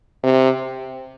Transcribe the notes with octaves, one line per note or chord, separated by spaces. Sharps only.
C3